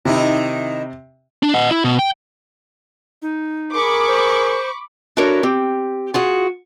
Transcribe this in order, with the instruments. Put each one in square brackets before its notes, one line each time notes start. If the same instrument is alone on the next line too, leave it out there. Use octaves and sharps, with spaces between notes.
[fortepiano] C3 [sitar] D#3 D#4 E4
[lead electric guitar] D4
D#5 F#5
E4
B2
G5
[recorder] D#4
[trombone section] G#4 A#4 [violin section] B5 C#6 D6
[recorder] C5
[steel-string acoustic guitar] D4 E4 F#4 A4 A#4 C#5
C4 G4
F4 F#4 G#4